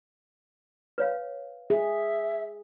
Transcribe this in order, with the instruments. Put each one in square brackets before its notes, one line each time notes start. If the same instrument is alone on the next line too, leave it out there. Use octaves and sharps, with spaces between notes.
[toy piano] B4 C#5 F5
[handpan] G#4 [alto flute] E5